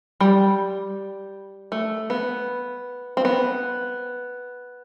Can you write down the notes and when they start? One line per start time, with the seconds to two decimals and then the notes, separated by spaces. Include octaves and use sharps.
0.21 G3
1.72 A3
2.10 B3
3.17 C4
3.25 B3